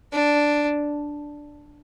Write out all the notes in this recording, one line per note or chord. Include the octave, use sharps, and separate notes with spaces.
D4